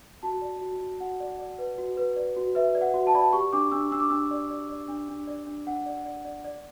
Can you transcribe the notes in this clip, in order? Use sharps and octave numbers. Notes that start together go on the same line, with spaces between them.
F#4 A5
D5
F#4
F#4
F#4 F#5
D5
D5
B4
F#4
B4
D5
F#4
B4 E5
D5
F#5
F#4
A5
D5 B5
A5
G4 C#6
D4 D6
D4 E6
D4 E6
D6
D4 E6
D5
D5
D5
D4
D4
D5
D4
D4 F#5
D5
D5
D5
D5